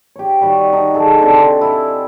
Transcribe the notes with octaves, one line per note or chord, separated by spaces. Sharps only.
G4 C#5
D#3 G3 F#4
D#4
G#4 A4
C3 D4 C6
E4